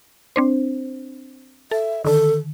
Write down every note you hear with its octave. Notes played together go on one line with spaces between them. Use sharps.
C4 D4 C5
A4 E5
D3 D#3 A4